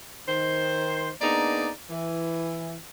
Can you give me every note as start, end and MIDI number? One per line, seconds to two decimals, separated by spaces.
0.28 1.10 51
0.28 1.10 72
1.22 1.70 58
1.22 1.70 59
1.22 1.70 62
1.22 1.70 63
1.22 1.70 68
1.22 1.70 74
1.90 2.76 52